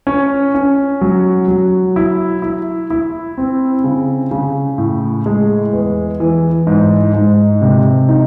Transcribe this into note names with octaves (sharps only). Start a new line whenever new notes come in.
C#4
C#4
F#3
F#3
E4
E4
E4
C4
C#3
C#3
A2
G#3
E2
E3
G#2
G#2
C3
D#4